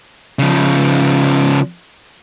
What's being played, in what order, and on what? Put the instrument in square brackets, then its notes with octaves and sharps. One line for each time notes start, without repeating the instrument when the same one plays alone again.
[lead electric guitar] C#3 F3